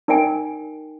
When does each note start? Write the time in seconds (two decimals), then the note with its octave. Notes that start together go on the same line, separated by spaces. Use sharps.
0.08 D#4 A#4 D5 G5 G#5